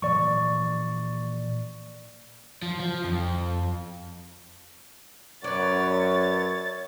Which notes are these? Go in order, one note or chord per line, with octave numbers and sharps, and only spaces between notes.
A#2 E3 F3 D5 C#6
F3
F3
F2
F#2 B4 C#5 D5 A6